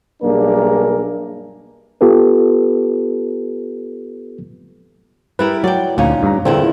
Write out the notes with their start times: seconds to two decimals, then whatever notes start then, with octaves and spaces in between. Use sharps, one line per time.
0.22 B1 G2 A#3 D4 G#4 A#4
2.01 B3 F4 G4 A4 B4
5.39 G3 E4 A#4 B4
5.64 F#3 D5 G5
5.98 D2 A#2 C#4 D#4
6.23 G2 A#5
6.45 E2 A#2 D3 C4 E4